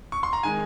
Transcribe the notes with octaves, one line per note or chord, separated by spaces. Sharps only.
C#6
C6
A#5
D#3 G#3 G#5